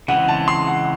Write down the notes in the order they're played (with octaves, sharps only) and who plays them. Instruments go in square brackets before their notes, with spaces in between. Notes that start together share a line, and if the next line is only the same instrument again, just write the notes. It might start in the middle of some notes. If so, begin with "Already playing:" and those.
[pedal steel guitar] C#3 E3 G#3 C4 [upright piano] F#5
[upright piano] A5
C6
F#5